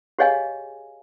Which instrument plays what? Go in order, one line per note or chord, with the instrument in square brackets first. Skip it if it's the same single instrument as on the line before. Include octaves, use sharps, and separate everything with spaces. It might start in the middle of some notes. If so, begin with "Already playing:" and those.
[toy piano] G4 G#4 C#5 D#5 F5 G#5